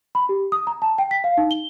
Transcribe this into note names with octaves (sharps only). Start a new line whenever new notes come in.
B5
G4
D#6
A#5
A5
G5
B6
F5
D#4
G7